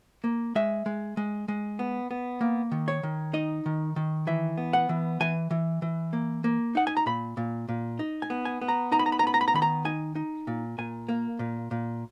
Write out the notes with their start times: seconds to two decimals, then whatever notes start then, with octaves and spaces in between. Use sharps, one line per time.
0.24 A#3
0.55 G#3 E5
0.86 G#3
1.17 G#3
1.48 G#3
1.79 B3
2.11 B3
2.41 A#3
2.71 D#3
2.88 C#5
3.03 D#3
3.33 D#4 D#5
3.66 D#3
3.96 D#3
4.27 E3 E5
4.57 B3
4.73 F#5
4.89 E3
5.20 E3 G#5
5.51 E3
5.82 E3
6.13 A#3
6.44 A#3
6.75 D#4 F#5
6.87 G#5
6.97 A#5
7.06 A#2 B5
7.37 A#2
7.69 A#2
7.99 D#4
8.22 G#5
8.30 B3
8.45 G#5
8.61 B3
8.68 A#5
8.92 D#4 A#5
8.99 B5
9.06 A#5
9.12 B5
9.19 A#5
9.23 B3 B5
9.34 A#5
9.41 B5
9.48 A#5
9.54 D#3 B5
9.62 A#5
9.85 D#4 G#5
10.15 D#4
10.47 A#2
10.78 A#2 G#5
11.09 A#3
11.39 A#2
11.71 A#2